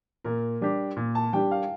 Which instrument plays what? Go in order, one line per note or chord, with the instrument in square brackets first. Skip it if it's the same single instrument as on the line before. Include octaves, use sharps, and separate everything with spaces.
[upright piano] A#2 [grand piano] A#4
[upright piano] G3 D4 G4
A#2
[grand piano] A5
[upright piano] G3 D4 G4 [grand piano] G5
[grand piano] F5